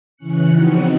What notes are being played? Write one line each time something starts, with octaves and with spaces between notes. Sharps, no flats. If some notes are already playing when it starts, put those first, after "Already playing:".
C#3 E3 C#4 F#6 C#7
C#3 F3 B3 C4 D#4 F#4